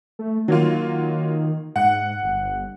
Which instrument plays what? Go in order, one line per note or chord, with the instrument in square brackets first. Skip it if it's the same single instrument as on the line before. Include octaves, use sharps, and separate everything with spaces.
[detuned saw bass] A3
[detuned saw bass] D#3 [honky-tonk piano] F#3 A#3 F4
[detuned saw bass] G#2 [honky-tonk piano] F#5
[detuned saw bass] G1